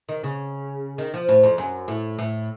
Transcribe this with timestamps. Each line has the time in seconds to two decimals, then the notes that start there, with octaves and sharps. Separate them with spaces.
0.09 D#3
0.24 C#3
0.98 D#3
1.14 F3
1.29 A2
1.43 F2
1.58 F#2
1.88 A2
2.19 A2